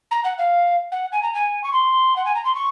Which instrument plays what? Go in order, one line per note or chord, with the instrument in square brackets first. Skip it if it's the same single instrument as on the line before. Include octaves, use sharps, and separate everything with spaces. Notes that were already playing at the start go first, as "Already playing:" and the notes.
[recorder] A#5
F#5
F5
F#5
G#5
A#5
G#5
C#6
C6
F#5
G#5
A#5
C6
C#6